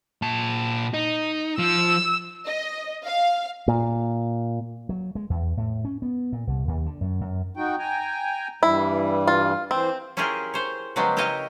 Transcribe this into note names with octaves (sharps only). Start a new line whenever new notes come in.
A#2 A5
D#4
F3 E6
D#5
F5
A#2
F#3
G#3
E2
A2
C#4
B3
A#2
C2
D#2
D3
F#2
F#2
D#4 F#4 G5
G5 G#5 A#5
G2 E3 G3 E4
F4
E3 C4 C5
C#4 E4 F4 G4 G#4 A#4
C5 C#5
C#3 F3 F#3 G#3 B3 G4
E4 G4 A#4 C#5 D#5 F5